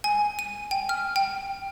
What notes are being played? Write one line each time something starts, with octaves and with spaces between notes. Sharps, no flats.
G#5
D#7
G5
F6
G5